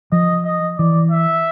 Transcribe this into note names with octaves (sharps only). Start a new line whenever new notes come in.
F3 D#5
D#5
E3 D5
E5